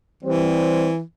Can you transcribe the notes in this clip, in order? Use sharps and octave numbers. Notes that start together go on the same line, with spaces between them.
E3 G3 C4 C5